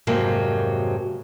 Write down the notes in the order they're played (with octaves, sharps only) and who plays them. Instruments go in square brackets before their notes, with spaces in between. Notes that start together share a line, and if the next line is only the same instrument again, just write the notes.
[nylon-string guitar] F2 G#2 C3 F#3 A#3